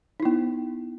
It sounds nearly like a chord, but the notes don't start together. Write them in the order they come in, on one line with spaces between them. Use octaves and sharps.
D#4 E4 B3